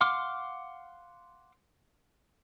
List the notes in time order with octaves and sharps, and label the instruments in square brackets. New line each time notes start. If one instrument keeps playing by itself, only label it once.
[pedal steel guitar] F5 F#5 C6 D6 F6